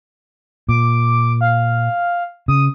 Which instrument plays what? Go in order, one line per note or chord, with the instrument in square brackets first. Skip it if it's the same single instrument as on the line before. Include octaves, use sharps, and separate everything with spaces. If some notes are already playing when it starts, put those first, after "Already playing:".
[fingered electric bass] A#2 [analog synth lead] D6
[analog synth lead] F5
[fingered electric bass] C#3 [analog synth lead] D#6